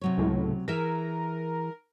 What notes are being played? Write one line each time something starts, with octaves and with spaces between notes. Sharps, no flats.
C3 F#3 C#5
C#2 A2
E3 G#4 A#4 E5